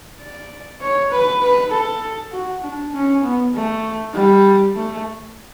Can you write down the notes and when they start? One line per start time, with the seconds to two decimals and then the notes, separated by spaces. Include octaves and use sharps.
0.20 D5
0.81 C#5
1.12 B4
1.42 B4
1.72 A4
2.32 F#4
2.63 D4
2.93 C#4
3.23 B3
3.54 A3
4.14 G3
4.75 A3